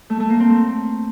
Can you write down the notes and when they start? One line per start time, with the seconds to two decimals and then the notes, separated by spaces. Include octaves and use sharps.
0.10 A3
0.20 A3
0.30 A#3
0.40 C4
0.50 A3